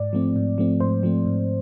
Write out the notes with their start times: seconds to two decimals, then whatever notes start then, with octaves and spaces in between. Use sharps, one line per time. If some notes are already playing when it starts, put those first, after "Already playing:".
Already playing: G#2 D5
0.13 F3 A3 C4
0.36 G#2
0.58 F3 A3 C4
0.80 G#2 C5
1.03 F3 A3 C4
1.26 G#2